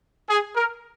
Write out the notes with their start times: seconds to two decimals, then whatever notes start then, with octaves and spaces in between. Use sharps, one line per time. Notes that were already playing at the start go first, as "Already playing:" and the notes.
0.28 G#4
0.56 A#4